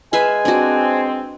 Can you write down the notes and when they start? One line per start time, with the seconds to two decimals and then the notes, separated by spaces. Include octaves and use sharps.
0.13 G#3 B4 E5 F5 G#5
0.45 C4 D4 F#4